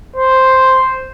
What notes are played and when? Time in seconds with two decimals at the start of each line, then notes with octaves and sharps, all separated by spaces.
0.16 C5